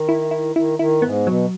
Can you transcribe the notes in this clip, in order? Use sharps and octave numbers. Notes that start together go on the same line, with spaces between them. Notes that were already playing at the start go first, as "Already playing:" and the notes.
Already playing: D#3
E4
E4
D#3 E4
D#3 E4
G#2 B3
B2 F#3